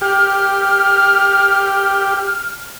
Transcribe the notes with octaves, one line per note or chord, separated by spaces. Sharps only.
G4 F6